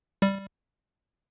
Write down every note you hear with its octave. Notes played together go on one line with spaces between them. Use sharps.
G3